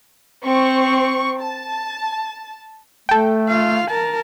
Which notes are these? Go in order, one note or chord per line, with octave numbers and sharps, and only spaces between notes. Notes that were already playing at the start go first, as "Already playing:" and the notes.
C4 C#6
A5
A3 A4 G5
F4 F5
A#4 A5